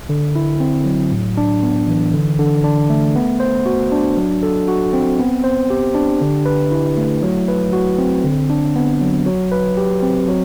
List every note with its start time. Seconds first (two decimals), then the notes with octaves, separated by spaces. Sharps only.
0.09 D3
0.36 E4
0.60 C4
0.85 F#3
1.12 A2
1.37 D4
1.63 B3
1.88 E3
2.14 D3
2.39 D3
2.64 D4
2.90 A3
3.16 B3
3.40 C5
3.66 F#4
3.92 D4
4.17 F#3
4.43 A4
4.68 F#4
4.93 C4
5.19 B3
5.44 C5
5.70 G4
5.95 D4
6.21 D3
6.46 B4
6.72 E4
6.97 A3
7.23 F#3
7.48 B4
7.73 F#4
7.98 C4
8.24 D3
8.50 D4
8.76 B3
9.01 F#3
9.26 F#3
9.52 B4
9.77 G4
10.03 C4
10.28 F#3